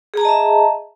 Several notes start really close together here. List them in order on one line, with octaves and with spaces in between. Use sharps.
G#4 A#5 A5 D#5 E5